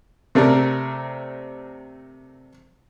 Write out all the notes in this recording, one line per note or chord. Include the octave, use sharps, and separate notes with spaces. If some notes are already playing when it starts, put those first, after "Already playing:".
C3 A3 C4 D4 A#4